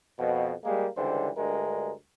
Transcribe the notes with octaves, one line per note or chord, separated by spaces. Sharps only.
F2 B2
G3 G#3 A#3
C#2 D3 E3 G3 C5
D2 G2 G#3 A#4